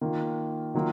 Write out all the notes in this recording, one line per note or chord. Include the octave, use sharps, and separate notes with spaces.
D#3 A#3 F4
D#3 F#3 A#3 F4